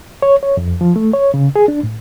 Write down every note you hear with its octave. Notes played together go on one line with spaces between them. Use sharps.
C#5
C#5
F2
F3
A3
C#5
C#3
G#4
D4
A2